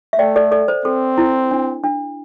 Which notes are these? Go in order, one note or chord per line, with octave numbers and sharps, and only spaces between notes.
E5
A3 D5 G5
A4 D5
A4 D5
C5
C4 A4
E4
D4
D4